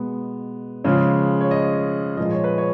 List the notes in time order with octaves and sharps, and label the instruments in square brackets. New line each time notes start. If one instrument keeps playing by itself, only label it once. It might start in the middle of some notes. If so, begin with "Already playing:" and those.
Already playing: [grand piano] B2 G#3 B3
C#3 F3 G#3 C#5
C#5
D#5
A#2 F3 G#3 D#5
C#5
B4
C#5